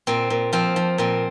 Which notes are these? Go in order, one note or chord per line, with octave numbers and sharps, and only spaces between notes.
A#2 C4
A#2
F3 C4
F3
A#2 C4